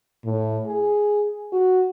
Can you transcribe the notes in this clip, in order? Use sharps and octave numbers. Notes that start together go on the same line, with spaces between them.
A2
G#4
F#4